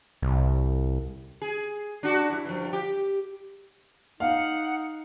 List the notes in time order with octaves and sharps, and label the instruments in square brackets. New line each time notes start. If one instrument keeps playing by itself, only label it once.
[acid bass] C2
[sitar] G#4
D4 F#4
F#2 E4
G2 F3
G4
[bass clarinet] D#4 [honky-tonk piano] F5 [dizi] F#5